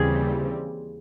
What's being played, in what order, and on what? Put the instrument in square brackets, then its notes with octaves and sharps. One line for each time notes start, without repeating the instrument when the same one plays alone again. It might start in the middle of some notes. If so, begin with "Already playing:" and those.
Already playing: [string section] D#2 C#3 E3 G3 C4 [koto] G#4